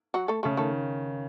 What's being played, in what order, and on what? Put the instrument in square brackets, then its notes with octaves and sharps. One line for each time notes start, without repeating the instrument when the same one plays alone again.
[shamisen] F#3 F#4
A3 A4
[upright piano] C#3 [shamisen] A3 A4
[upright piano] D#3 [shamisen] A3 A4